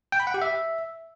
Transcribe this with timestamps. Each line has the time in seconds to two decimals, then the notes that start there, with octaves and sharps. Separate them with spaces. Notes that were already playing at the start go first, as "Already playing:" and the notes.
0.12 G5
0.20 B5
0.27 F#5
0.34 G4
0.42 E5